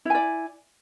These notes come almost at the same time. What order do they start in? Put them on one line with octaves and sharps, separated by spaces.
E4 G#5 D5